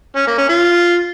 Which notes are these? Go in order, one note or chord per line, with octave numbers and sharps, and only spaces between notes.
C#4
A#3
C#4
F4